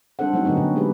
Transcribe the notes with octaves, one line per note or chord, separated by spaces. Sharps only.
G3 C4 D4 A4 C5 F#5
F#3 A3 C4 C#4 D#4 F#4
D3 F#3 B3 C#4 D#4
A#2
G#3 A#3 F#4 G4 B4